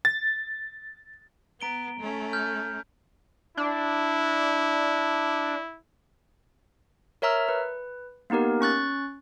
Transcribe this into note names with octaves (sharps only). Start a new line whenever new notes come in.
A6
B3 A#5 D7 G7
A3 C#4
F6 G6
D4 E4
A#4 C#5 E5 A#5 E6 F6
B4
A#3 B3 D#4 G4 A#4
C#4 C#6 F#6 A6